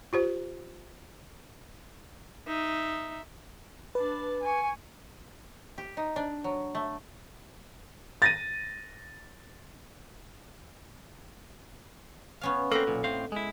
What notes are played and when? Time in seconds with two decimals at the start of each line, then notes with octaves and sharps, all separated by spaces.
0.13 F4 G4 C5
2.47 D#4 E5
3.95 D4 B4 A5
4.42 G#5 C#6
5.78 G4
5.97 D#4
6.16 D4
6.44 F#3
6.75 A3
8.22 A6 A#6 D#7
12.41 B3 C#4 F5
12.72 A#3 C4 A4 D#5 F#5 B5
12.87 B1 A#2
13.04 A2 C4 F5
13.32 G#3 E4